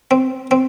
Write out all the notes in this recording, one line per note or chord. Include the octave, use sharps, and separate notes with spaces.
C4
C4